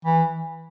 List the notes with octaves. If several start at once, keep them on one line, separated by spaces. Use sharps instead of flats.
E3